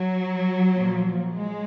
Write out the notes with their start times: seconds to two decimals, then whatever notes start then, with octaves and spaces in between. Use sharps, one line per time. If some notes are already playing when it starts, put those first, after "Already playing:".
Already playing: F#3
0.75 A#2 F3
1.34 G#3